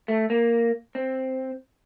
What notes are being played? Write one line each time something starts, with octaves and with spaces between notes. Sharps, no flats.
A3
A#3
C4